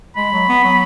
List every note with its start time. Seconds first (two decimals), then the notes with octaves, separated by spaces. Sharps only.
0.16 G#3 B5
0.33 F#3
0.49 B3
0.64 F#3